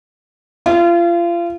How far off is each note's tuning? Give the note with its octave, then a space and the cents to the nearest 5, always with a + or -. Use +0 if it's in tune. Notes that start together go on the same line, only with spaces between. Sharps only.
F4 -30